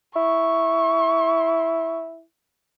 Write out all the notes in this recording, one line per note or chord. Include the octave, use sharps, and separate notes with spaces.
E4 C#6